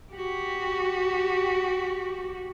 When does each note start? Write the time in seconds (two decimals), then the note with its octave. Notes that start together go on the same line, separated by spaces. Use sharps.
0.13 F#4 G4